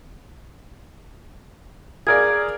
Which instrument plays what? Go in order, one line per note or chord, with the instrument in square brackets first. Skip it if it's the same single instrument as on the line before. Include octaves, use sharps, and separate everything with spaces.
[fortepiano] G#4 A#4 D5 [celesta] G#6